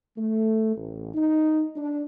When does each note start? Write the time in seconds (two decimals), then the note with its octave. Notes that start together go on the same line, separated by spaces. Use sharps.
0.17 A3
0.76 A1
1.14 D#4
1.76 D4